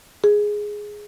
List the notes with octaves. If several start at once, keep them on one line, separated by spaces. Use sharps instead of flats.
G#4